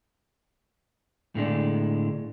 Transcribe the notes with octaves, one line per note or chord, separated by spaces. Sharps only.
A2 D3 G#3 D4